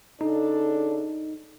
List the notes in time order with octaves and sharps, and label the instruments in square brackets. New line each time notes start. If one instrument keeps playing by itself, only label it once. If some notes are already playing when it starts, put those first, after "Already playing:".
[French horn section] C#3 D4 A4 [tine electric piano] D#4